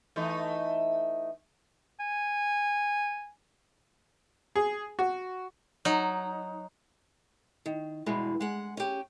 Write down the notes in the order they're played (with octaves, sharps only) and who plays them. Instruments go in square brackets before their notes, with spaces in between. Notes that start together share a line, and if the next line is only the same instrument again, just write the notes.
[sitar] E3 A3 D#4
[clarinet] G#5
[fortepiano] G#4
F#4
[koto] F#3 D#4
[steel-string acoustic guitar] D#3
E2 G2 B2 E3 G#3
G#3 F#5
C#4 G4